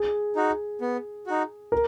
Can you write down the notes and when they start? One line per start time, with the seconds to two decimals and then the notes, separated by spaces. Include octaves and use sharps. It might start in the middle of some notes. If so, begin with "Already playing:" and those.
Already playing: G#4
0.36 D#4 F#4
0.81 B3
1.27 D#4 F#4
1.72 A#4